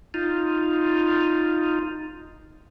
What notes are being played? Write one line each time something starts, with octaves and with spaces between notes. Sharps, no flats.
D#4 F4